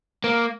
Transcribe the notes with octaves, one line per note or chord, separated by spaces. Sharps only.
A#3